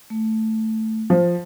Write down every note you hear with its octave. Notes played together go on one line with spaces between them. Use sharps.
A3
F3